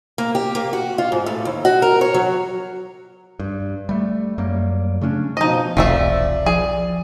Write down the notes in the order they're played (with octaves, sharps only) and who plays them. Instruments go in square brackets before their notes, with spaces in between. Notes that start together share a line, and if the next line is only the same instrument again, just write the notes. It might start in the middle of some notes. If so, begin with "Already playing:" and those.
[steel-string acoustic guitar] A#3
G4
A#3
F#4
F4
G#2
A2
D#2
F#4
A#4
C#5
F#3
[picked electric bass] G2
G3 A3
F#2 F#3 G3 A#3
C#3 A3 C#4 D4
[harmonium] B2 F3 [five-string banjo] D#4 D#5
[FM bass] E1 [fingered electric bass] B1 E2 C3 [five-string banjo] F3 A3 E5 [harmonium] D5
[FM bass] F3 [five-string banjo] G#4